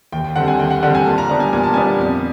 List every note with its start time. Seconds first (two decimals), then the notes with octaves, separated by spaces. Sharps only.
0.12 D#2 G5
0.24 G5
0.36 D3 G3 C4 F#5
0.48 G#5
0.59 D#2 G5
0.71 F#5
0.83 D3 G3 C4 F#5
0.95 G#5
1.06 A#2 A5
1.18 A#5
1.29 G3 B3 D4 A5
1.40 G#5
1.53 A#2 G#5
1.64 A5
1.74 G3 B3 D4 G#5
1.99 F2